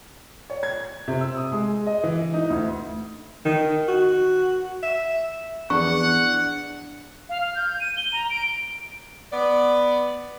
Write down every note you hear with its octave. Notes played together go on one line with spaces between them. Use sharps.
C#5
G#6
C3
E6
D#6
G#3
D#5
E3
D#4
D2
D#3
F#4
E5
E2 D4 F#5 C#6
F5
F6
G6
D#7
G7
A#5
D7
B3 D5